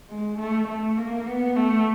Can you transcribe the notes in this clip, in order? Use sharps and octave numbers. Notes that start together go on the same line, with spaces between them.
G#3
A3
A3
A#3
B3
A3